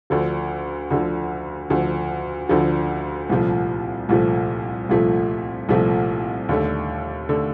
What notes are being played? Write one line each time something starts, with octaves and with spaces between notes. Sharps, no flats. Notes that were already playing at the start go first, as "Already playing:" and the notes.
D2 D3 F3
D2 D3 F3
D2 D3 F3
D2 D3 F3
C2 A#2 F3 A3
C2 A#2 F3 A3
C2 A#2 F3 A3
C2 A#2 F3 A3
D#2 D3 A3
D3 A3